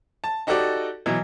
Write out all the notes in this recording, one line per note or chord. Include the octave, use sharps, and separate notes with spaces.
A5
D#4 F#4 G4 A4 D5 D#5
B2 E3 F#3